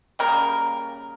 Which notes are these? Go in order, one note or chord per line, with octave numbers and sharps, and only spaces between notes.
C#3 G3 A#3 A#4